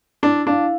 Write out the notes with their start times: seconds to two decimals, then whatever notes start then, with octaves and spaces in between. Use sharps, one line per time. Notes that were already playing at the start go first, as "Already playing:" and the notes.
0.23 D4 E4
0.47 D4 F5